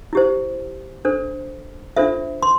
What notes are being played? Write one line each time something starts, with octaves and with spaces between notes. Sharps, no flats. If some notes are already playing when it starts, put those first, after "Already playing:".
E4 G4 C5
D4 A4 C5
D4 F4 A4 C5 E5
C6